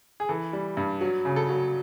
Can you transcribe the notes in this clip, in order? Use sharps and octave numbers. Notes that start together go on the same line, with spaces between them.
G#4
E3 A4
G3
G2
F#3
C#3
A4
F#3